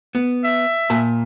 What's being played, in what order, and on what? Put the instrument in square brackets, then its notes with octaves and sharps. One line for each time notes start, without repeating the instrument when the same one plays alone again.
[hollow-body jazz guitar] B3
[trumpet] E5
[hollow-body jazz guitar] A#2 A5